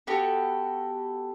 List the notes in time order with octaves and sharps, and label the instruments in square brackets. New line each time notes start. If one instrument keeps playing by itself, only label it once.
[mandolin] B3 F#4 G4 A4